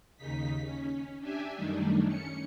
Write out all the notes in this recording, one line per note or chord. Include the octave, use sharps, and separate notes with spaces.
D#2 C#3 D#4 B6
C#4
D4 G4 E5 G#5
F#2 D#3 G3 A3 D4 D#4
C#4 C#7